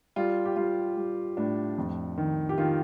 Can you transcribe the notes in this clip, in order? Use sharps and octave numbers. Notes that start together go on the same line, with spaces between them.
G3 F4
G4
G3 F4
G3
A2 D4
F2
D#3
G4
D#3 F4